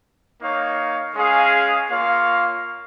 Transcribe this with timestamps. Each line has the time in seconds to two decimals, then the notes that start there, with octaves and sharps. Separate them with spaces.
0.40 A#3 D#4 C#5 F5
1.14 G#3 C#4 G#4 F5
1.90 A#3 F4 C#5 F5